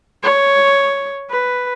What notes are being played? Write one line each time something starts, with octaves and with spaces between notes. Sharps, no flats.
C#5
B4